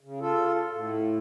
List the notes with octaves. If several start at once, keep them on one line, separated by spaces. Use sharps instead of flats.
C#3
F4 A4
A2